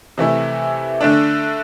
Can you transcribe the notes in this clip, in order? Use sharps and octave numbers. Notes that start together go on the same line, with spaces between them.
C3 E3 A3 E4
D3 A3 D4